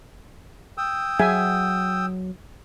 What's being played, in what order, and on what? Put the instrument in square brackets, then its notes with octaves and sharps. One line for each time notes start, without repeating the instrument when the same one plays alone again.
[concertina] G5 D#6 E6
[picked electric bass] F#3 [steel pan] G#4 E5 G#5